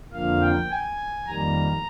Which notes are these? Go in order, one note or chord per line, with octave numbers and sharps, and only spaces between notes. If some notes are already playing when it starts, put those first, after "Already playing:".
F2 D3 F3 A#3 F5
G5
G#5
F2 D#3 G3 A#3 A#5